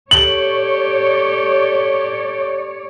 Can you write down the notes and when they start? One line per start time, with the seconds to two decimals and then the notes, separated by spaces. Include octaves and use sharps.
0.11 G4 A4 C#5 D5 F#7